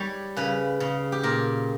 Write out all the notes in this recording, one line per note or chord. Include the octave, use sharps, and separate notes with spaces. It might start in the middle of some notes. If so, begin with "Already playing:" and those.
Already playing: G3 G4 C#5
C#3 B4
C#3
G4
A#2 A#4